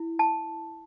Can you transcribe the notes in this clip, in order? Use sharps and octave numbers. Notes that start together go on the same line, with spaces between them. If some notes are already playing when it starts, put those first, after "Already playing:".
Already playing: E4
A5